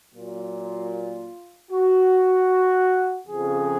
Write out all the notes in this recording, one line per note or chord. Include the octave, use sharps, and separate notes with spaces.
A#2 F#3 A#3 F4
F#4
F2 C#3 F3 G#4